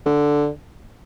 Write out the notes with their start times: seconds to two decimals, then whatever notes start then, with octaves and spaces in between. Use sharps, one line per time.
0.06 D3